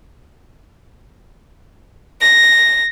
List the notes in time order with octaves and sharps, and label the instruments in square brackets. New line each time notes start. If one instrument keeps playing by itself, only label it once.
[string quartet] A#6